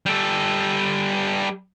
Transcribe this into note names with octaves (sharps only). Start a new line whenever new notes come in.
G3 A4